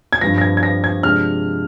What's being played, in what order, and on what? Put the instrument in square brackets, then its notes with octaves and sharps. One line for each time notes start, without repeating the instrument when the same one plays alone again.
[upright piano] G#6
G2 F3 C4 A#6
A#6
G#6
G#6
A#6
G#6
C3 F3 G#3 D4 F6